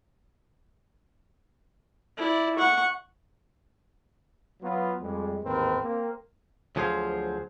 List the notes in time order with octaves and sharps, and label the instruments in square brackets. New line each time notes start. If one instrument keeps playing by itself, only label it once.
[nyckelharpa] E4 D5
F#5 C#6
[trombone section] F#3 B3 F4
F2 G3 G#3
A1 D#2 G#2 C4 A#4 B4
A#3 C4
[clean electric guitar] D2 F3 F#3 G#4 C5 F5